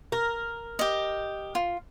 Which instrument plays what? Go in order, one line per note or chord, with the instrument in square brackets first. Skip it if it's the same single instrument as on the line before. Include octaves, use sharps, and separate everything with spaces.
[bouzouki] A#4
[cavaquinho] G4 D#5
F4